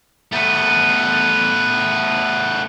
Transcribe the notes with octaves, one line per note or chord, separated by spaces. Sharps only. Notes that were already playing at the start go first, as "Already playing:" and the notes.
A3 B3